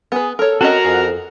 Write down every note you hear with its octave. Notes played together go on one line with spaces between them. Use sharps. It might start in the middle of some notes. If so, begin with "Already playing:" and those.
B3 G#4 B4
A4 A#4 C#5
C4 C#4 F#4 A#4 D#5 F#5 A#5
F2 G#4